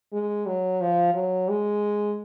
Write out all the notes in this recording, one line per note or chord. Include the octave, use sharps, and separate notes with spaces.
G#3
F#3
F3
F#3
G#3